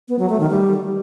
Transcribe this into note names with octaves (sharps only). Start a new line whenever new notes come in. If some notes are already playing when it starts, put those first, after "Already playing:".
B3
F#3
A3
D#3
G3